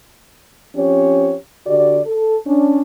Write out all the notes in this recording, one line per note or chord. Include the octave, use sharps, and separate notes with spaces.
F3 C4 C#4 G4 C#5
D3 F#4 G4 D5
A4
C#4 D4